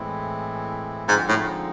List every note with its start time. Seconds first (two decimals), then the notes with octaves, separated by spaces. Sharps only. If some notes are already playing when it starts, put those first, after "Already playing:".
Already playing: A2 E3 G#3 C4 E4
1.07 G#2 D3 F3 G#3 C4 D#4
1.28 A2